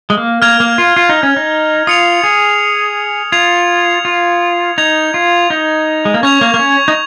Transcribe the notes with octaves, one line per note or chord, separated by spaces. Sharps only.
G#3
A#3
A#3 F6 G#6 F7
A#3
F4
F4
D#4
C#4
D#4
F4 D#6 C#7 F7
G#4
F4 G#6 F7
F4
D#4 G#6 F7
F4
D#4
G#3
A#3
C#4 C#6 G#6 F7
A#3
A#3
C#4
D#4